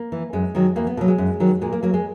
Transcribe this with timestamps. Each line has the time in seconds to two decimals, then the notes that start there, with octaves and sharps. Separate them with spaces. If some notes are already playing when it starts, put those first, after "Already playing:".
Already playing: A#3
0.12 E3
0.33 F#2 G#3
0.55 D#3 F#3
0.76 E2 A#3
0.87 B3
0.97 B2 F#3 A#3
1.08 G#3
1.18 F#2
1.40 D#3 F#3
1.61 A#2 G#3
1.72 A#3
1.83 F#3 A#3
1.94 G#3